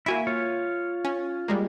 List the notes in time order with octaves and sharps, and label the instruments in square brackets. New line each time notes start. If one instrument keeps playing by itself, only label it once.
[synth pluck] A#3 F#4 E5 [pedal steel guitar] E4 G#5
[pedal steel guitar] F4 C#5
[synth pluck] C#4
G3 G#3 A#3